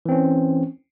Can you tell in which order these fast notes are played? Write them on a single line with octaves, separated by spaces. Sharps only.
E3 C4 C#4